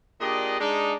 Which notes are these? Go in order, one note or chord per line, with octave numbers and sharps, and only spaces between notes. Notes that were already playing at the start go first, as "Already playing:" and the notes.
A#2 D4 G4 G#4 D5 D#5
G#3 D4 D#4